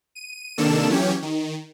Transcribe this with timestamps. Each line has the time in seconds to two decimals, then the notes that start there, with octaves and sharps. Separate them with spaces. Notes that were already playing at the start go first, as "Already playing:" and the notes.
0.15 D#7
0.58 C3 D#3 A#3 D4 A4 E7
0.89 E3 F#3 C#4 G4 C#5
1.22 D#3